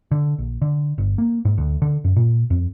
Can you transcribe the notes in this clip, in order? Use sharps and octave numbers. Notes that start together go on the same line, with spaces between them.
D3
A#1
D3
G1
A#3
G#2
D2
D3
F#2
A#2
F2